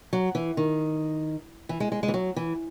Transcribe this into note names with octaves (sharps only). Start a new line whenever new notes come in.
F#3
E3
D#3
E3
G#3
G#3
G#3
E3
F#3
E3